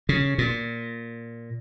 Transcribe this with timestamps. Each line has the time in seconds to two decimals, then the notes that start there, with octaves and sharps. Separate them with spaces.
0.09 C#3
0.38 A#2